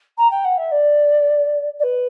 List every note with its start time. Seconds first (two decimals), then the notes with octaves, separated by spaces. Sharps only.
0.18 A#5
0.30 G5
0.44 F#5
0.57 E5
0.71 D5
1.79 D5
1.83 B4